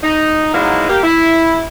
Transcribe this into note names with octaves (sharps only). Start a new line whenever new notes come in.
D#4
F#3 G#3 A#3 B3 D#4 E4
A#3 G4
E4